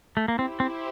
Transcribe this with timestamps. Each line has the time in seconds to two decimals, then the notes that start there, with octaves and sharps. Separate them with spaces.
0.17 A3
0.28 A#3
0.39 C4 E4 G4 C5
0.60 C4